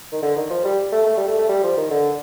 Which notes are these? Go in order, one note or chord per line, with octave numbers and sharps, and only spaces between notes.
D#3
D3
D#3
F3
G3
A3
A3
G3
A3
A3
G3
F3
D#3
D3